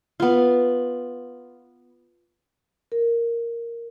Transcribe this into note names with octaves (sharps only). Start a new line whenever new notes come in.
B3 F4
A#4